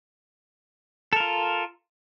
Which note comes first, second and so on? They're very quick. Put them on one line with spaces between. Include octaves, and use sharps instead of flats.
A4 A#4 F4